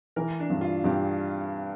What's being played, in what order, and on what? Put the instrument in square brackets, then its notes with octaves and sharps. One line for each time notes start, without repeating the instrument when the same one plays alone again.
[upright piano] E3 [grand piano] A#4
[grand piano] D4
[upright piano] G2
[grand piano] F4
[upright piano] G2 [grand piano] G4